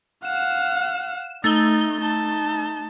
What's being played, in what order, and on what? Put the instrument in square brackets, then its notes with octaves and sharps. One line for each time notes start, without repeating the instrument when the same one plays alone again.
[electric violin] F5 F#5 [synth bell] E7
[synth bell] A3 G7 [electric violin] D#4
[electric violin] D#4 A5